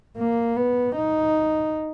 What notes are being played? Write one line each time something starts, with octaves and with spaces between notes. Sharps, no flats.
A#3
B3
D#4